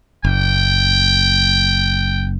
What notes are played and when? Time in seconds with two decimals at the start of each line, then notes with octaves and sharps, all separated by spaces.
0.24 F#1 G5